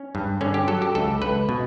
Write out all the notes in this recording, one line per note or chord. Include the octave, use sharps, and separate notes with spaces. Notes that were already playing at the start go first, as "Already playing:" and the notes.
Already playing: C#4
G2
D3 C#4
G4
F#3 A4
G4
C#2 A4
C#2 B4
B2